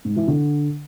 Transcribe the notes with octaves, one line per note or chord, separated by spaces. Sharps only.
G#2
E3
D3